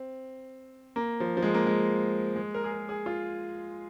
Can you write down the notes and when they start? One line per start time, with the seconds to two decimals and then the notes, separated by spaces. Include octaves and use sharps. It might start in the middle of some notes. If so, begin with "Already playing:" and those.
Already playing: C4
0.96 A#3
1.20 F3
1.37 F3
1.42 G#3
1.54 A#3
1.67 G#3
2.36 G#3
2.54 A#4
2.64 G#4
2.72 A#4
2.89 G#4
3.06 F4